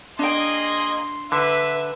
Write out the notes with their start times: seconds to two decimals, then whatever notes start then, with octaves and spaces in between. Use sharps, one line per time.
0.19 A#3 D4 G#4 D#5 G5 C6
1.32 D3 B4 E5